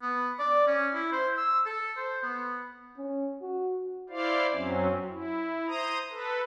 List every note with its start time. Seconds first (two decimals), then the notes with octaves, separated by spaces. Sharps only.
0.02 B3
0.39 D5
0.67 C#4
0.94 E4
1.12 C5
1.37 E6
1.66 A4
1.96 C5
2.23 B3
2.97 C#4
3.42 F#4
4.10 E4 C5 D5 F5
4.53 F#2 F#3 C4 C#4
5.09 E4
5.67 C5 A#5 D#6
6.11 A4 B4